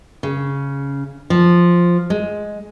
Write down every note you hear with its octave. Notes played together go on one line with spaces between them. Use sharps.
C#3
F3
G#3